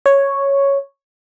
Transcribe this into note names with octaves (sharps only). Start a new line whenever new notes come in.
C#5